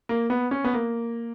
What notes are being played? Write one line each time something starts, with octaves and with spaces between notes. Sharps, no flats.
A#3
B3
C#4
B3
A#3